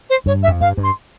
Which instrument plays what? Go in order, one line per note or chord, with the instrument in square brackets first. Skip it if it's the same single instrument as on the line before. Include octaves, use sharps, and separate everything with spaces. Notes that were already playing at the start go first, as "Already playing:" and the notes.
[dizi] C5
[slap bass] G2 [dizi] C#5
[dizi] E5
[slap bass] F2
[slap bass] G2 [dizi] F5
[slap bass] G2
[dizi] C6